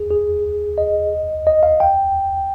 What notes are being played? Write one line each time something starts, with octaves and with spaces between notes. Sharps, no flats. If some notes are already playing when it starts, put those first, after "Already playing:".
Already playing: G#4
G#4
D#5
D#5
F5
G5